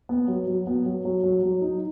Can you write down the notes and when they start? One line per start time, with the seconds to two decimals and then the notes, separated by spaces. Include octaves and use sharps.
0.09 B3
0.28 F#3
0.48 F#3
0.67 B3
0.86 F#3
1.05 F#3
1.23 F#3
1.43 F#3
1.62 D#4